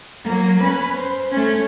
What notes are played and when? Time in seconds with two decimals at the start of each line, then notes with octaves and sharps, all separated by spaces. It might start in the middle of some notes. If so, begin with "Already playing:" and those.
0.24 F#3 A#3
0.60 C#4 B4
0.96 C5
1.31 A3 C#4